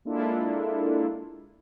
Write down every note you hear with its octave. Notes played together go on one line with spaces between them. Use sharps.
G#3 A#3 D4 E4 F4 A4